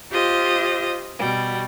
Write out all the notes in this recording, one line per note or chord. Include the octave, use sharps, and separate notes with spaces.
F4 G4 C5 D#5
B2 G3